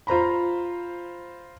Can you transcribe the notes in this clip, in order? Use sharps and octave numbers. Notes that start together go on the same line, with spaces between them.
F4 C5 A#5 B5